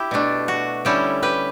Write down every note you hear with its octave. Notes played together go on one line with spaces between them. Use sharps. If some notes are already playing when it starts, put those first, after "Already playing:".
Already playing: E4 G4
B2 A3 D4
F#4
D3 G3 C#4 E4 G4
G4 B4